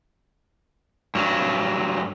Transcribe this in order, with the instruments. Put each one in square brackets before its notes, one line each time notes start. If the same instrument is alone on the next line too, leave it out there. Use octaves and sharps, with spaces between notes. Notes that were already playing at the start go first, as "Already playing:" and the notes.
[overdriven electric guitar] G2 F#3